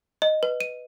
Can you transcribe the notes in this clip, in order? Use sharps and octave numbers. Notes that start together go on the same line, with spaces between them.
D#5
B4
D#7